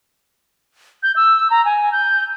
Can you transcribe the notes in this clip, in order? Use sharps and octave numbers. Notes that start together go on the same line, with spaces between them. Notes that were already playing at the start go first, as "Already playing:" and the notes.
G6
E6
A#5
G#5
G6